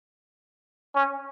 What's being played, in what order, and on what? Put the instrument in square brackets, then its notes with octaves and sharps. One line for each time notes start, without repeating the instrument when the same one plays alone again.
[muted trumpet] C#4